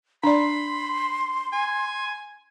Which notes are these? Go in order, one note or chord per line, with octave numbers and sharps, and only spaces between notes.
D4 D5 B5 C6
G#5